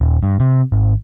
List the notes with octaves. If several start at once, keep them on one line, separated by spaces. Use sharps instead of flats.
D#1
G2
C3
G#1